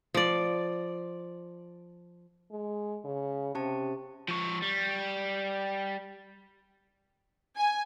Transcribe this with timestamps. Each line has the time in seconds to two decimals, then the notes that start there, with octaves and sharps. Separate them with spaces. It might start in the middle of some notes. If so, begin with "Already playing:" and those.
0.14 F3 D5
2.51 G#3
3.05 C#3
3.55 C3 C#4 G4 A5
4.28 F3 C#5
4.62 G3
7.56 G#5